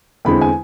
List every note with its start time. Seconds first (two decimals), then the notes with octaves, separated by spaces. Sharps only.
0.25 E2 D3 G#3 C4 B5
0.41 G#5